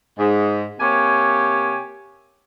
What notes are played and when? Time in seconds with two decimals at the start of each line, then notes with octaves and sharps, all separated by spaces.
0.18 G#2
0.80 C3 A#3 G4 C#5 G#5